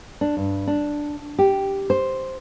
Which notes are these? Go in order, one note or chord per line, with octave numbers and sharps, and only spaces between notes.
D4
G2
D4
G4
C5